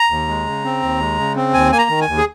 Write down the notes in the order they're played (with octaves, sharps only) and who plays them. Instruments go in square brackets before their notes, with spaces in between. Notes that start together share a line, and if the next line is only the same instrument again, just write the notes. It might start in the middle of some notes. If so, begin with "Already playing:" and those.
Already playing: [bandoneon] A#5
D#2
G#3
C#3
C4
D#2
G#3
C#3
C4
D#2 G#5
A#3 G#5
A#5
D#3
G#5
D#2
G#4